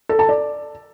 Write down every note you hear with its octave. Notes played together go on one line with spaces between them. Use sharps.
A4
A5
D5